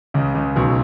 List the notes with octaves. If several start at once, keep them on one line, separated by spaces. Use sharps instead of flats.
C#2 C#3
C#2 C#3
B1 B2